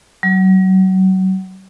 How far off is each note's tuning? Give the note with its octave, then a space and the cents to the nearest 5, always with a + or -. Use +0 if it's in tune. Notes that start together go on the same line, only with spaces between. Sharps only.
F#3 +30